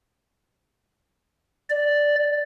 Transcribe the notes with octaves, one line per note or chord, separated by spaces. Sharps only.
D5